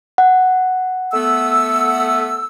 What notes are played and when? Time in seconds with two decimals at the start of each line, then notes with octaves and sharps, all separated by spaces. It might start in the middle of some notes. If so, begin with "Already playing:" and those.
0.18 F#5
1.13 A3 B3 E6